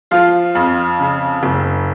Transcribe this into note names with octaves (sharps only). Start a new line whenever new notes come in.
F3 F4 F5
F2
C#3
F#1